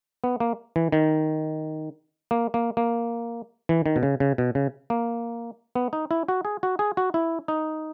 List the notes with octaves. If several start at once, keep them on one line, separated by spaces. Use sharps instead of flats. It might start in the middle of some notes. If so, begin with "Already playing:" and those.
B3
A#3
E3
D#3
A#3
A#3
A#3
E3
D#3
B2
C#3
C#3
B2
C#3
A#3
B3
D#4
E4
F#4
G#4
F#4
G#4
F#4
E4
D#4